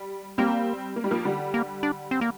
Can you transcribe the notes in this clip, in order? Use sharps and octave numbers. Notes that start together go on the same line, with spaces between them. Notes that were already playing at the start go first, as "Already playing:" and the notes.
Already playing: G3
G3 A#3 C4
A#3
G3
F3 A#3
D3 G3
A#3
D4
C4
A#3